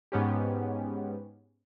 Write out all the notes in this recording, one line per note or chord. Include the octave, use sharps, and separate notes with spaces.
G#2 B3 C#4 G4